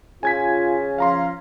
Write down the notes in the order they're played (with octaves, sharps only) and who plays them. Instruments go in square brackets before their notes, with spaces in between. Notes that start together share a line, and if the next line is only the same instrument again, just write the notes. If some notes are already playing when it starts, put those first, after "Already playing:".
[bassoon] C#3 [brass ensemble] F4 [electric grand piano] G#5 G#6 B6
[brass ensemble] F3 C#4 F4 [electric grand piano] F5 A#5 C6